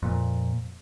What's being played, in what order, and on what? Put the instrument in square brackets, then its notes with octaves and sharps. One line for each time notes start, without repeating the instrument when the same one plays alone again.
[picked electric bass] F2 A#2